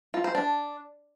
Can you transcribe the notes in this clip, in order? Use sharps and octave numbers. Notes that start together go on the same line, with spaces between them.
F4
C5
D4